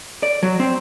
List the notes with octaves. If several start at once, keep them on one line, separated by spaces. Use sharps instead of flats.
D5
F#3
C4